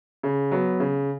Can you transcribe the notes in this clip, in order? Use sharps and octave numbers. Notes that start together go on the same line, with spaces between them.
C#3
F#3 B3
C#3